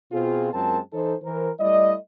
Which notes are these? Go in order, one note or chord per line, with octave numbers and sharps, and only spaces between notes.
B2 C4 F4 G#4
F#2 G#3 C4 F4 A#4 A5
E3 D#4 A4 C5
E3 A#4 C5
G3 A3 E4 D5 D#5